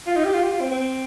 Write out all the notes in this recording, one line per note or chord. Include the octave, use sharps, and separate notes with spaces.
F4
D#4
G4
F4
G4
F4
C4
C4